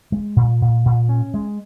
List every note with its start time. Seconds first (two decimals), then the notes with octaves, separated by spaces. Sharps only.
0.12 G#3
0.36 A#2
0.61 A#2
0.85 A#2
1.09 C#4
1.34 G#3